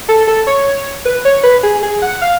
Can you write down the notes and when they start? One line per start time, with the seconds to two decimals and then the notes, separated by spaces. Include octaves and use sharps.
0.09 A4
0.27 A4
0.47 C#5
1.05 B4
1.25 C#5
1.43 B4
1.63 G#4
1.83 G#4
2.02 F#5
2.21 F5